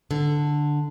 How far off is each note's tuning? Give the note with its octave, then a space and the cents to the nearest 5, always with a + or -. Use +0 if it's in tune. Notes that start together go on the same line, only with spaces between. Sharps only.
D3 +5